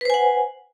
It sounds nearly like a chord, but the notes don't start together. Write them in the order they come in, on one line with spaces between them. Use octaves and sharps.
B4 C5 G#5 F#5